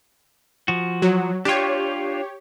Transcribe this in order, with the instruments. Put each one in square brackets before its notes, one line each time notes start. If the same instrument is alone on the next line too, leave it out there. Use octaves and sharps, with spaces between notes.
[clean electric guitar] F3 F#4
[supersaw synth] F#3
[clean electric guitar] D4 F4 [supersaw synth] G4 C#5